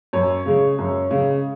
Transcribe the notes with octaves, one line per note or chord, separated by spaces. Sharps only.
F#2 C#5
C#3 G#3
F#2
C#3 G#3